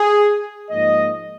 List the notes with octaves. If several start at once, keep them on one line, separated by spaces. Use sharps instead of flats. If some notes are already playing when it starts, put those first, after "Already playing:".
Already playing: G#4
G#2 F3 A#3 D#5